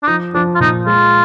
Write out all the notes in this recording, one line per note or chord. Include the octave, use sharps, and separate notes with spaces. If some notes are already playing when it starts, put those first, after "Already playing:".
D4
F3 D#4
F3 D4
F4
A#2 D#4
G#3 F4